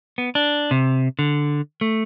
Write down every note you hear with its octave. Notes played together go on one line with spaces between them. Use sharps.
B3
D4
C3
D3
A3